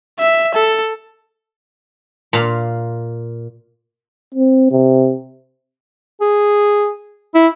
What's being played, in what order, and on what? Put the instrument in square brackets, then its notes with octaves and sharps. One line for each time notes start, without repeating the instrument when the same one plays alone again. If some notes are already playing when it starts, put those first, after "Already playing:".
[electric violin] E5
A4
[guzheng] A#2 F5
[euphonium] C4
C3
[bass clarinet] G#4
E4